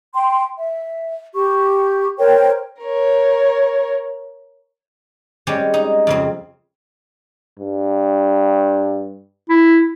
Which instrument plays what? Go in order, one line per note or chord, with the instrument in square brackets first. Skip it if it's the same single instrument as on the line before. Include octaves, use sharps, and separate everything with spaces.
[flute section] G5 C6
E5
G4 C#6
A#4 C5 C#5 G5
[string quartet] A#4 C#5
[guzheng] G3 G#3 C4 C#4 G4 C5
D#4
F2 C#3 C4
[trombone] G2
[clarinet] E4